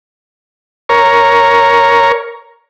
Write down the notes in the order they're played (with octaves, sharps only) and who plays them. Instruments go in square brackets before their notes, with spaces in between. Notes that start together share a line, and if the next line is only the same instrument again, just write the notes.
[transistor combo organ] A#4 C#5